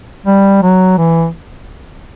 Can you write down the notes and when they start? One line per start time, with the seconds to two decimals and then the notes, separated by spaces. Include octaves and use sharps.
0.26 G3
0.62 F#3
0.98 E3